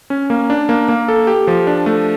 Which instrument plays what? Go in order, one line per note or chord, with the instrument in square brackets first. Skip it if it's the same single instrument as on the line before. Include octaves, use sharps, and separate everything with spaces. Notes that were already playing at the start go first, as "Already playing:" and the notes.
[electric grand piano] C#4
A#3
D4
A#3
A#3
A4
G4
F3
D4
A3